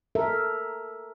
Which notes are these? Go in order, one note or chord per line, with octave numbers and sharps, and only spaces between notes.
A4 A#4 E5